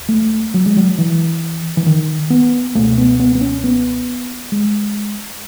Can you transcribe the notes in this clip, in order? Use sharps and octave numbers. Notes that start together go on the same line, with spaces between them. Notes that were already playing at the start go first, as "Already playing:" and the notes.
Already playing: D#2
A3
F#3
G#3
F#3
E3
E3
D#3
B3
C#2 B2 A3
B3
B3
B3
C#4
B3
G#3